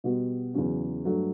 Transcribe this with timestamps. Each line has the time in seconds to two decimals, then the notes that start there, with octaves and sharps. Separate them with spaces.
0.04 B2 G3 B3 F#4
0.54 E2 C#3 F#3 C#4 F#4
1.05 G2 F#3 A3